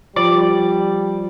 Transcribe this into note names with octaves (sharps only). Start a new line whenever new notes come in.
F3 G3 D5